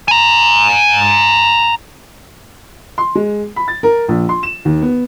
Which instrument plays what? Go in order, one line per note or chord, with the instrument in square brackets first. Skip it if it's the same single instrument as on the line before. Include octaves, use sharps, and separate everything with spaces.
[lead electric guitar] G#5 A#5
[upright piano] C6
G#3
B5
A6
A#4
A#1
C6
E7
D#2
B3